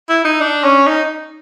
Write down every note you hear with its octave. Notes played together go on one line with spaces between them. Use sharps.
E4
D#4
D4
C#4
D#4